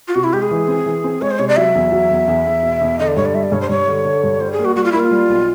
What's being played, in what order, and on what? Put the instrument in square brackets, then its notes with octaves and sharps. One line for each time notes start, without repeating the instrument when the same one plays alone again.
[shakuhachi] F4
[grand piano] C3 [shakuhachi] F#4
[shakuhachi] E4
[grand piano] G#3 [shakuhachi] G4
[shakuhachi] G#4
[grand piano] E3
C4
E3
C4
[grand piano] G#3 [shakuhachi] C#5
[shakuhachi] C5
[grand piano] C3 [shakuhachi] C#5
[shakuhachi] D5
[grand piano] F#3 [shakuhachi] E5
[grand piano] E2
F#3
E2
E2
E2
B2
E2
[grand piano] D3 [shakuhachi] D#5
[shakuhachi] D5
[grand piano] G2 [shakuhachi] C#5
[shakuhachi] D5
[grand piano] G3 [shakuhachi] E5
[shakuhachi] D5
[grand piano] G2 [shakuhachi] C#5
[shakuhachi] C5
[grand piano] G2 [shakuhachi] C#5
[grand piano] D3
D3
G2
[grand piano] G3 [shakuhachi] C5
[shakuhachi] G#4
[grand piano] A#3
[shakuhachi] F#4
[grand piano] G3 [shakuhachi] F#4
[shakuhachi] F4
[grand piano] A#3 [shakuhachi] E4
[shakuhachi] F4
[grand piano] G3
B1